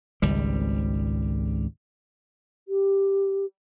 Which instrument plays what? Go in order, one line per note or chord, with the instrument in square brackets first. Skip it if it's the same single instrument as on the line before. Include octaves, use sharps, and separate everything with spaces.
[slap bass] G#1 C#2 G3
[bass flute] G4